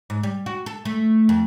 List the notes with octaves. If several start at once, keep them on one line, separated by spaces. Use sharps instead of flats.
G#2
G3
F#4
A4
A3
F2